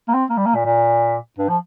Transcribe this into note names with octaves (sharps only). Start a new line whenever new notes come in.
A#3
C4
A#3
G3
A#3
A#2
A#2
G2
F3